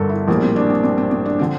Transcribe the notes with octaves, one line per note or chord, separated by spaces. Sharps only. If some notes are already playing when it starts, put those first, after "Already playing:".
Already playing: G1 G2 D3 A4 A#4
E4
A#1 A2 G3 A#3
C4
D4
C4
C4
C4
C4
D4
D3 F3 C4